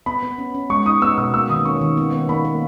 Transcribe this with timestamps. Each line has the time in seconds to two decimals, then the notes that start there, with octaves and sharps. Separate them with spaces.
0.06 B3 B5
0.23 B3
0.38 C#4
0.54 C#4
0.70 G#3 C#6
0.86 D#4 D#6
1.02 B3 E6
1.18 B2 E6
1.34 A#3 E6
1.50 D#3 D#6
1.65 C#4 C#6
1.81 D#3
1.97 B3
2.13 B3
2.29 A#3 B5
2.45 A#3